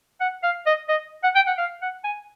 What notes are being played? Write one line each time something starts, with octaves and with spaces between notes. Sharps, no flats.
F#5
F5
D#5
D#5
F#5
G5
F#5
F5
F#5
G#5